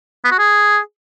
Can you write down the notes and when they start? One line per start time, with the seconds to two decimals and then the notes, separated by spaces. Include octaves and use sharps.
0.24 B3
0.32 F#4
0.39 G#4